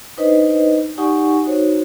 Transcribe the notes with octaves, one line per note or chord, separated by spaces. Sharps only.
D4 D#4 B4 C5 D#5
D#4 G4 D5 F#5 G#5 C#6
D#4 F#4 C5 C#5